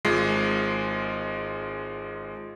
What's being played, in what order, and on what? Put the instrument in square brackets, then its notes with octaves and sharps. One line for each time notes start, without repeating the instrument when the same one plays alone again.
[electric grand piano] G#1 G#3 F4 C7